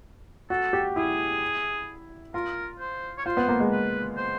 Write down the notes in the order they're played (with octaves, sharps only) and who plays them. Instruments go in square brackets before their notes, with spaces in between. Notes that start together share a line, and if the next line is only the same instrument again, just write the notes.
[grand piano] F#4 [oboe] A4
[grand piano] G4
[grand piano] E4 [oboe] G#4
[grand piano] F4 [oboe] A#4
[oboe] C5
C#5
[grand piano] F4 [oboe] C5
[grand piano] B3
A#3
G#3
[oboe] B4
C5